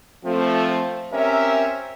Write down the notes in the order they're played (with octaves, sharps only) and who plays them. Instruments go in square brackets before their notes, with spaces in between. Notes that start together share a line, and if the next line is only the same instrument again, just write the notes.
[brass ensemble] F3 A3 C4
C4 C#4 G4 A#4 E5